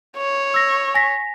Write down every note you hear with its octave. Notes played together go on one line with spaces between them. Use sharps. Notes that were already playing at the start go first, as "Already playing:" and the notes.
C#5
E6 A#6
G#5 A#6 B6